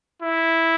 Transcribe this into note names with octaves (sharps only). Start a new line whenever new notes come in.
E4